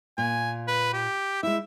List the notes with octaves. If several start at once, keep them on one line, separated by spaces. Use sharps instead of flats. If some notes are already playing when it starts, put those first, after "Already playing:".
A#2 G#5
B4
G4
G#3 E4 E5